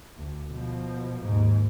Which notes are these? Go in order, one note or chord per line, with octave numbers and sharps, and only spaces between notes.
D2
B2 F3
D#2 G#2